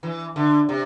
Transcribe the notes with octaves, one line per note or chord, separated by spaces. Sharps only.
E3
D3
C3